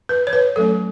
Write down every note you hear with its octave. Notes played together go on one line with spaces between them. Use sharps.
B4
C#5
B4
F#3 A3 C#4 A4